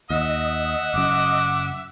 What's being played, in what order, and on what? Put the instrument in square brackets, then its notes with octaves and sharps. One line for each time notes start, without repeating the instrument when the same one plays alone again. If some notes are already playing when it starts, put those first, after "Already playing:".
[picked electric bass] D#2 [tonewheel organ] D#5 [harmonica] E5 F#5
[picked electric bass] F#1 F#2 [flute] D6